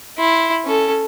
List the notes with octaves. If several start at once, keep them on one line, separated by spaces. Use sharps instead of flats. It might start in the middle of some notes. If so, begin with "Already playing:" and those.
E4 C6
C#4 A4